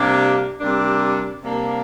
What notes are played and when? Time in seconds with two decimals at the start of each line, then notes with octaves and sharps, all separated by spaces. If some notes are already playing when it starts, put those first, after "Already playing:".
Already playing: C3 G3 A#3 D4
0.60 C3 G3 A#3 D4
1.42 C3 G3 A#3 D4